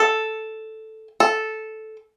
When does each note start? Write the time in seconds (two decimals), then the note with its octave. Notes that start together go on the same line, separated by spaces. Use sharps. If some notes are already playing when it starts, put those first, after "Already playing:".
Already playing: A4
1.20 A4